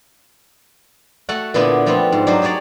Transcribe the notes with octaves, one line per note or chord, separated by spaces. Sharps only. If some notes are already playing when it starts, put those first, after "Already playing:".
A3 F#4 A4 F#5
A#2 D3 B3 D4 E4
F3 A3 B3 C4 F4
G#2
F#3 D4 D#4 C5
D#4 G4 G#4 C#5 D5